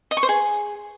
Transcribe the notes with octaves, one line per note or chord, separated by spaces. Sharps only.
D#5
C#6
C5
G#4